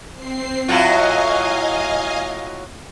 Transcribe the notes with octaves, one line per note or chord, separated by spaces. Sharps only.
C4 C7
A2 F#3 F4 D#5 F5 G#5